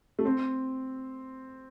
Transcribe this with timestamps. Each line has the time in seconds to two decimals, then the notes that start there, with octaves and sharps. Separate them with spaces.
0.19 A3
0.25 C4